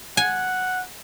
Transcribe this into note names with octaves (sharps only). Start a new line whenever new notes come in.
F#5 G#5